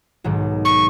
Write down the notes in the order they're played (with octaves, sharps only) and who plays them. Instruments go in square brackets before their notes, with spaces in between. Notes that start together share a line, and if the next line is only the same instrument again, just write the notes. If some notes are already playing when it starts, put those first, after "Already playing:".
[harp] B1 G#2 D#3
[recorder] C#6